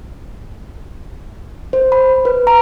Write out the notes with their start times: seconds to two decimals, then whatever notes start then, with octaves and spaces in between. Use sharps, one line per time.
1.73 C5
1.92 B5
2.25 B4
2.47 A#5